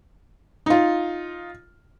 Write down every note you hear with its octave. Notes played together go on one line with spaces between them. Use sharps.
D#4 F4